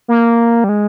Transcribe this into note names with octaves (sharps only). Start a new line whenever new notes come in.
A#3
G3
G#3